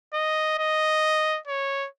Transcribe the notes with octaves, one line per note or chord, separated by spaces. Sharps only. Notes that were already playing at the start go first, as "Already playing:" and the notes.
D#5
D#5
C#5